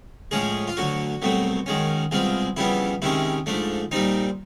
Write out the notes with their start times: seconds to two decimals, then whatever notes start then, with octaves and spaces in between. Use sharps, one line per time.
0.31 A2 F3 G#3 C#4 G#4
0.67 F4
0.77 D2 D3 F#3 F#4
1.22 C2 B2 F#3 A3 C4
1.66 F#2 D#3 G#3 C#4
2.11 C2 B2 G#3 C4 F4
2.57 F2 C#3 E3 G3 B3 E4
3.02 C3 D#3 G#3 C#4 E4
3.46 G#2 F3 A3 D4
3.92 A#2 G3 C4 D#4